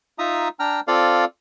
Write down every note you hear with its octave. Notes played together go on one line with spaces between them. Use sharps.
D#4 F4 E5 A#5 D#6
D4 G5 A#5 F6
C4 F4 A4 D5 F5